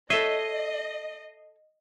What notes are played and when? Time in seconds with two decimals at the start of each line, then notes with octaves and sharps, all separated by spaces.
0.10 A4 C#5 D#5 E5 C7 D#7 G7